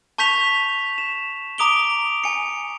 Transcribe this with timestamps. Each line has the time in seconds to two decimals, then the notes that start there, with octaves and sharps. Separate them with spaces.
0.18 A5 C#6 G6 B6 F7
0.98 E7
1.58 A#5 D6 D#6 D7 F7 G7
2.24 G#5 C#7